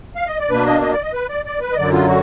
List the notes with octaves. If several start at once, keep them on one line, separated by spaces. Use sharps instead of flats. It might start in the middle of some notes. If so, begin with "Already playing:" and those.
F5
D#5
D5
B2 A#3 D4 B4
D#5
D#5
D5
D#5
B4
D5
D5
B4
D#5
F#2 D3 F#3 D5
F4
F#4